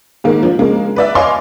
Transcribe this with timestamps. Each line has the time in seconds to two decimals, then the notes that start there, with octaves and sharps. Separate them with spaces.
0.24 G#2 D#3 G#3 A#3
0.43 F3 D4
0.59 C#3 G#3 A#3
0.96 B4 D5 E5
1.15 C#5 D#5 F5 G#5 C6 D6